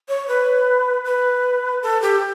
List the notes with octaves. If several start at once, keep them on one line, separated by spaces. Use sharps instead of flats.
C#5
B4
B4
A4
G4